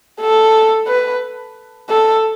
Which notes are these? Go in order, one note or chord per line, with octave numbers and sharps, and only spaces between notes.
A4
B4
A4